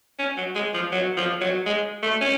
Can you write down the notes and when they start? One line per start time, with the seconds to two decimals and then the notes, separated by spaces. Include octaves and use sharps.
0.19 C#4
0.37 F#3
0.55 G#3
0.74 F3
0.92 F#3
1.17 F3
1.41 F#3
1.66 G#3
2.03 A3
2.21 C#4